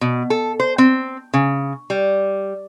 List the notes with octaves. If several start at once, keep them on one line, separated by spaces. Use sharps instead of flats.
B2
A4
C5
C4
C#3
G3